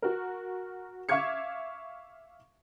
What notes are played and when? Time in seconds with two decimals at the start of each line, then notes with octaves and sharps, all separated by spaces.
0.02 F#4 A#4
1.09 E5 F5 C#6 D6 G#6 C#7